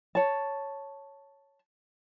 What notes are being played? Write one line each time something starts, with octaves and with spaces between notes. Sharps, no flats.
C#5 A5